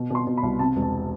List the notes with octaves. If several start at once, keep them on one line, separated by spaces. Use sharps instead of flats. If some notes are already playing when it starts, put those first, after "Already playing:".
Already playing: B2
B2 C6
B2
B5
C2
C3 A5
E1
A5